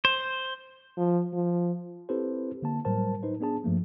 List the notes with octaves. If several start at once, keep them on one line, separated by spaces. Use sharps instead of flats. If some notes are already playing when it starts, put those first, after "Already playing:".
C5
F3
F3
C4 E4 G4 A4 B4 C5
D3 A#3 A5
A2 F#3 G3 A#4 C5 A5
D#4 B4 C5
B3 D4 G#4 A5
G2 F3 A3 A#3